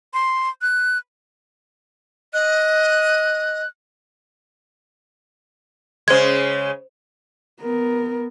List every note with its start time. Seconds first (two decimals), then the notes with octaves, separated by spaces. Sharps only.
0.14 C6
0.62 F#6
2.34 D#5 F#6
6.08 C#3 G#3 C5 G#6
7.61 B3 A#4